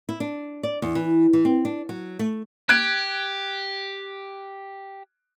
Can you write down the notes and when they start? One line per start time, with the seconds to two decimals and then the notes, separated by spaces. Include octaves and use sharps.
0.09 E4
0.20 D4
0.63 D5
0.82 E2
0.95 E3
1.33 E3
1.45 C4
1.65 D4
1.89 F#3
2.19 A3
2.69 G4 F#6 G#6 D7